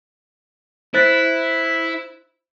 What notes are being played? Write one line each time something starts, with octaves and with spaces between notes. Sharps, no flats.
E4 C5 F#6 A6